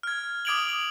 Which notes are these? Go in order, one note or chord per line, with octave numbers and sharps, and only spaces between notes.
F6 G#6
D6 D#6 G#6 D7 F7 F#7
F#7